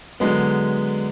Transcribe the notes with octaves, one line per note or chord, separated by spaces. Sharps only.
D3 F#3 G#3 B3